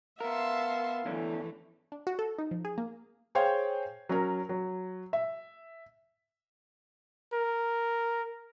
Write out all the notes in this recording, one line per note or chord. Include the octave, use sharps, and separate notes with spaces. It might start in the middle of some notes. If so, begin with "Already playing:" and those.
B3 A#4 E5 F5 A5 C6
E2 D3 E3 A3 C#4
D4
F#4
A4
D#4
F3
G#4
A#3
G#4 C5 C#5 F5 G5 G#6
F#3 C#4 A#4
F#3
E5
A#4